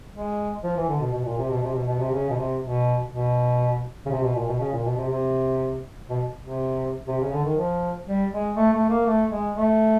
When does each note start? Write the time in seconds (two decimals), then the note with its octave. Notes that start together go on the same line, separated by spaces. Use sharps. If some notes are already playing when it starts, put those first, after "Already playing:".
0.14 G#3
0.63 F3
0.77 E3
0.89 D3
1.00 B2
1.13 B2
1.25 A#2
1.38 C3
1.50 B2
1.63 C3
1.75 B2
1.88 B2
2.00 C3
2.12 C#3
2.30 B2
2.37 C3
2.61 B2
3.11 B2
4.06 C#3
4.11 C3
4.23 B2
4.35 A#2
4.47 B2
4.60 C#3
4.73 A#2
4.85 B2
4.97 C3
5.09 C3
6.09 B2
6.41 C3
7.08 C3
7.20 C#3
7.33 D3
7.45 D#3
7.57 F3
8.07 G3
8.32 G#3
8.56 A3
8.73 A3
8.90 A#3
9.06 A3
9.30 G#3
9.55 A3